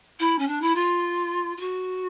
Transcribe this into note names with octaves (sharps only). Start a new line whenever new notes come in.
E4
C#4
D4
E4
F4
F4
F#4